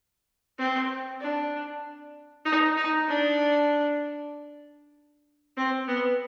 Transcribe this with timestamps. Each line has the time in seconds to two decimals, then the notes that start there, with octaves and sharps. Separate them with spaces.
0.59 C4
1.21 D4
2.45 D#4
2.77 D#4
3.08 D4
5.57 C4
5.88 B3